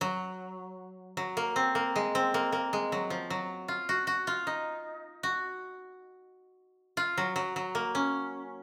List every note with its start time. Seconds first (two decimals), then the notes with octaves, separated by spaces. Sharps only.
0.01 F#3
1.17 F#3
1.37 A#3
1.56 C4
1.75 A#3
1.96 G#3
2.15 C4
2.34 A#3
2.52 A#3
2.73 G#3
2.92 F#3
3.10 F3
3.30 F#3
3.68 F4
3.89 F#4
4.07 F#4
4.27 F4
4.47 D#4
5.23 F#4
6.97 F4
7.18 F#3
7.36 F#3
7.56 F#3
7.75 A#3
7.95 C#4